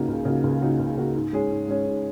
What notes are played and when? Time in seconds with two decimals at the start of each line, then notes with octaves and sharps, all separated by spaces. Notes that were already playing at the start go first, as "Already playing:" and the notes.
Already playing: C#3 A#3 D#4 F#4
0.08 C#2
0.25 C#3 A#3 D#4 F#4
0.44 C#2
0.61 C#3 A#3 D#4 F#4
0.79 C#2
0.97 C#3 A#3 D#4 F#4
1.15 G#2
1.33 G#3 C#4 G#4
1.50 G#2
1.68 G#3 C#4 G#4
1.86 G#2